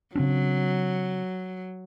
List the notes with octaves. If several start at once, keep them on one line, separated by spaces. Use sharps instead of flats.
C#3 F#3 C4 D4